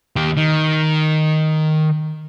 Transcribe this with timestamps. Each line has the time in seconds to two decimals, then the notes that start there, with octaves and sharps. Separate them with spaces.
0.16 D#2 G4
0.37 D#3